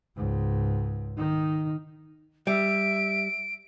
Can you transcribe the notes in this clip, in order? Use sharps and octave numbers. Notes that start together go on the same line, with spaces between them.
C#2 G#2
D#3 D#4
G3 E5 D7